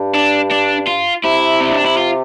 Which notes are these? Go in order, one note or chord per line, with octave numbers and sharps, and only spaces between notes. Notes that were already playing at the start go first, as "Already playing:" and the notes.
Already playing: G2
D4
D4
F4
C3 E4
C4
D4
E4
F4